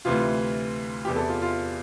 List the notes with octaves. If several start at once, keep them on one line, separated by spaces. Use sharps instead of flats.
D2 C3 E3 F4
E2 C3 E3 G4
A4
F4
F4